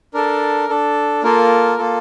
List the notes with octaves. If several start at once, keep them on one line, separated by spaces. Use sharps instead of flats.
D4 A4 A#4
D4 A4
A#3 F4 A4 A#4
A#3 F4 A4